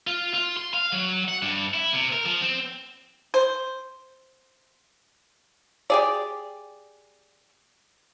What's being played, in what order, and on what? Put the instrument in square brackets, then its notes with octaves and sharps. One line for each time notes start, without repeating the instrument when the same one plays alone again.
[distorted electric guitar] F4
F4
C6
F5
F#3
F#5
G2
E4
C3
A#4
F3
C4
[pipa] C5
G4 G#4 D5